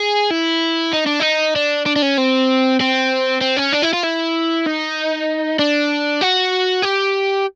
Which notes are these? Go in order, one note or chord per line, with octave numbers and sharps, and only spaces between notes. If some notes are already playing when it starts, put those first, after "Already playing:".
Already playing: G#4
E4
D#4
D4
D#4
D4
D4
D4
C#4
C4
C4
C4
C#4
D4
E4
F4
E4
D#4
D4
F#4
G4